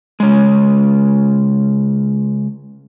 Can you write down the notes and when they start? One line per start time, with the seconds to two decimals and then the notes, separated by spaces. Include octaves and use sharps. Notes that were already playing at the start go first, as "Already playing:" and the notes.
0.20 C#3 G#3